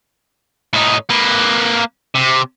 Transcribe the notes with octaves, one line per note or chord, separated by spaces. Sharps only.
A2 D#4
A#3 B4
C3